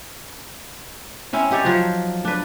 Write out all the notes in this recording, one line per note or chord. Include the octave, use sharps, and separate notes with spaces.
C4 C#4 E4
D#4 G4 C#5 D5
F3 F#3 C5
D4 B4